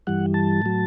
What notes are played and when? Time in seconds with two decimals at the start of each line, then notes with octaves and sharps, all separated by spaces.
0.07 G2 E3 G3 F#5
0.34 A5
0.62 A2 F#3